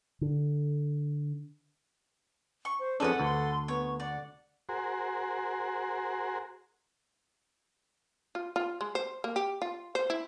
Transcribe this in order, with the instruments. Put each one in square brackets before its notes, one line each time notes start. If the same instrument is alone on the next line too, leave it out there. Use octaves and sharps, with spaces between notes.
[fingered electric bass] D3
[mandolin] C#6
[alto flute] C5
[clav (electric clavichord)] F2 C#4 D4 [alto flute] G#4 [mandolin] A4 B4 F#5
[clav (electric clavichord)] D2 [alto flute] C6
[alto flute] B3 [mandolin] C#5
[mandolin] D5 [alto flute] F#5
[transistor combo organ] F#4 G#4 A#4 C5
[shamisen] F4
F4
G#3
C5
A#3
G4
F4
C5
E4